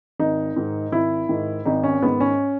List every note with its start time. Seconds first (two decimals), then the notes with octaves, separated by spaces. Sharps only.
0.20 G#1 D#4
0.56 G#2 D#3
0.92 G#1 E4
1.29 G#2 D#3
1.65 G#1 D#4
1.83 C#4
2.02 G#2 D#3 B3
2.20 C#4